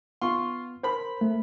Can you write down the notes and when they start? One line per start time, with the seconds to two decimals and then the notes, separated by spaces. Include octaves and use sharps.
0.21 B3 F4 C6 C#6
0.83 A#4 C5 B5
1.21 A3